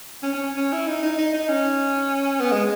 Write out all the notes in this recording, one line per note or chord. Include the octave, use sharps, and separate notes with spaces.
C#4
C#4
C#4
E4
D#4
D#4
D#4
D#4
C#4
B3
G#3